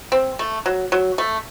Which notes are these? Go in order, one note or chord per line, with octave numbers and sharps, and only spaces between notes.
C4
A3
F#3
F#3
A3